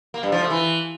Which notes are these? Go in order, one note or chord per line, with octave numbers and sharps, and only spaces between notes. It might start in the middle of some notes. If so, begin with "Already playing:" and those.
A#3
G2
F3
A3
E3